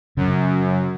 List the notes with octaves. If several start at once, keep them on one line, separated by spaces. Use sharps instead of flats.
F#2 C#3